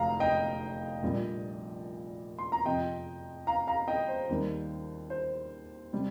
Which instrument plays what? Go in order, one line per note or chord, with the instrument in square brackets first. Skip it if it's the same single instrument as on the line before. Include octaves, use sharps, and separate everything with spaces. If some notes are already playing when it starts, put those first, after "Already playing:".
Already playing: [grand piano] F1 F2 F5 A#5
D#5 G5
A#1 A#2 G3
C6
A#5
F2 C3 F3 D#5 G5
F5 A#5
F5 A#5
D#5 G5
C5
D#2 D#3 G3
C5
C3 G3